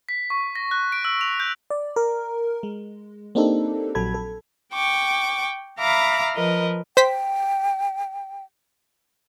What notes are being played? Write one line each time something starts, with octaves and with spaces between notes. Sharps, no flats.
B6
C#6
A#6
F#6
D7
E6
F7
G6
D5
A#4
G#3
A#3 C4 D4 D#4 G4 A4
A#1 F#3 A4 B5 G#6
A4
G5 C#6 D6
E5 F5 A#5 B5 D6
F3 A#4 B4 D#5
C5 G5 B6